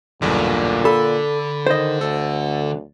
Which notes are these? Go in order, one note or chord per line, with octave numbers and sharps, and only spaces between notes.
B1 E2 G2 A#2 D3
A4 B5
D#3 C5 D#5
D2 A4